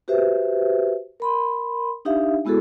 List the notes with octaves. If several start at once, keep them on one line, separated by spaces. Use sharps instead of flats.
F#4 G4 B4 C5 E5
A#4 B5 C6
D4 D#4 G4 E5 F5
G#3 B3 E4 F#4 G#4 A4